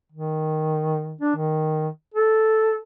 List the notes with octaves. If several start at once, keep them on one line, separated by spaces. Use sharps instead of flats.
D#3
D4
D#3
A4